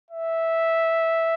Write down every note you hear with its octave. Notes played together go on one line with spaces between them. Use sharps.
E5